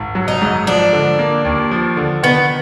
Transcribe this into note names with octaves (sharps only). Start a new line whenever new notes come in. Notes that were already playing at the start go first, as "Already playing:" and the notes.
Already playing: G#1
F#3
D#4
G#2
F3 D4
D3
A#3
D#2
F3
D3
D#3 B3